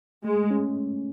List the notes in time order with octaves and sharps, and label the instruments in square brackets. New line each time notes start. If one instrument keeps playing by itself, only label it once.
[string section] G#3 [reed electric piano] A3
[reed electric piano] C#4